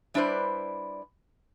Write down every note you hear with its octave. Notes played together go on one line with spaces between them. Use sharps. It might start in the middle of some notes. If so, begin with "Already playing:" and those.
G3 D4 E4 B4 C5 D5